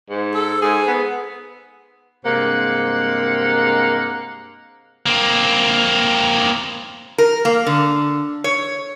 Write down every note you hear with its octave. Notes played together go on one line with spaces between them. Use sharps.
G#2
A4
G#2 G#4
B3
G2 C3 G#3 A#3 C5 F#5
A#3 C4
A#4
A#3
D3
C#5